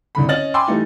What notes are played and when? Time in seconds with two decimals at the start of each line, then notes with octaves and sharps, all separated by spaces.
0.15 C2 D3 B5
0.28 C#4 D#5 F6 A6 F#7
0.54 G5 G#5 B5 C6 D6 E6
0.68 E3 G3 A3 D#4